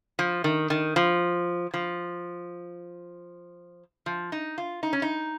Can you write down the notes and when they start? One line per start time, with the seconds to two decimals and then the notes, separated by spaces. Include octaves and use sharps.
0.19 F3
0.44 D#3
0.70 D#3
0.96 F3
1.74 F3
4.06 F3
4.32 D#4
4.58 F4
4.83 D#4
4.93 C#4
5.02 D#4